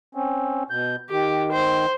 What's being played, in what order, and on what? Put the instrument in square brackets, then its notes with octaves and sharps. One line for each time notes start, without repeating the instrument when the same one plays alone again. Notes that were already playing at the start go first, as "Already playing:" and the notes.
[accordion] C4 C#4
B2 G6
[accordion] D#3 [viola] G4
[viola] C5